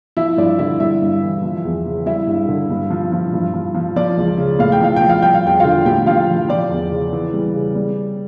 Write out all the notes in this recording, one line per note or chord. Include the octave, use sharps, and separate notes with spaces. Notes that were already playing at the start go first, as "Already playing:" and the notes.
F3 E4 E5
G2 D5
D3 E4 E5
G3 E4 E5
G2
E3
F3
E2
C#3
G3 E4 E5
G2
D3
G2
F3
F3
G2
F3
F3
F3 D5
C#2
C#3
A2 F5
G5
F3 F5
F3 G5
F5
G3 G5
F5
E2 G5
D3 F4 F5
A2 G4 G5
F3 F4 F5
F3
F3 D5
E2
C#3
E3
G3
C#3
G3